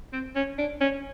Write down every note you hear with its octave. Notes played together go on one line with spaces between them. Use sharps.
C4
C#4
D4
C#4